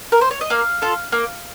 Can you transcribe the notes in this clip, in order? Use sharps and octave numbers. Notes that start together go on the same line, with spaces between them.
A#4
C5
C#5
D#5
A#3 F5
F4 A4
A#3